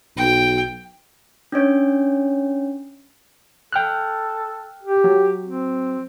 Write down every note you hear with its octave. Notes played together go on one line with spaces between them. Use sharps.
B1 G5
C#4 D4 C#5
A4 G5 F6 F#6
G4
F#3
C4